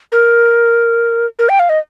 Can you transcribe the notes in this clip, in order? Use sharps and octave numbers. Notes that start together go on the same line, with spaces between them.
A#4
A#4
G5
F5
D#5